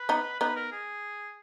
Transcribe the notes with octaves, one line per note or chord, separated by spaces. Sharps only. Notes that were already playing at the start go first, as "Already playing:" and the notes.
Already playing: B4
B3 D#4
B3 D#4 B4
A#4
G#4